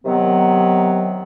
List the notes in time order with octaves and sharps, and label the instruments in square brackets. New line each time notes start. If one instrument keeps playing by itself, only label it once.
[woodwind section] C3 D#3 F#3 B3